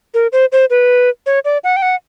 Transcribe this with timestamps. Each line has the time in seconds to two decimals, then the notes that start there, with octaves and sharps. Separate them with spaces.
0.14 A#4
0.32 C5
0.52 C5
0.70 B4
1.26 C#5
1.45 D5
1.64 F#5
1.76 G5
1.82 F#5